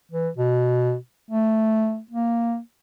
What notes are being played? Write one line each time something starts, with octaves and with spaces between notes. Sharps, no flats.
E3
B2
A3
A#3